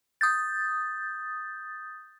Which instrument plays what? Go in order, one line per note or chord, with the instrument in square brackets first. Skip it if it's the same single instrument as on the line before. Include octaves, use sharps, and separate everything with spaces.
[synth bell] D#6 G6 A6